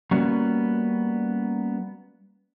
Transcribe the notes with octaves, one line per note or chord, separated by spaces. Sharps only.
G3 A#3 B3 C#4 F#4